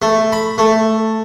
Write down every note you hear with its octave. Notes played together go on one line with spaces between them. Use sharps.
A3
B5
A3